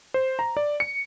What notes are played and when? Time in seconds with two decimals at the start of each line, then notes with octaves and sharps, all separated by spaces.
0.14 C5
0.39 A#5
0.57 D5
0.80 C#7